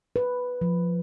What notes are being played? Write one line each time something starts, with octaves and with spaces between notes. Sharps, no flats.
B4
F3